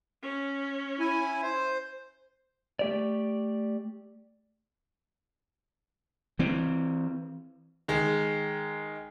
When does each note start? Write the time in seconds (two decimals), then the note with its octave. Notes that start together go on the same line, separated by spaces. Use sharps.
0.23 C#4
0.99 E4 G#5
1.42 C5
2.79 A3 G4 D5
6.39 E3 C4
7.88 D#3 G#3